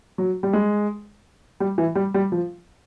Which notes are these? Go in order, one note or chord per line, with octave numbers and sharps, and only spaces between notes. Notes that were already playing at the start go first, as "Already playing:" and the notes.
F#3
G3
G#3
G3
E3
G3
G3
F3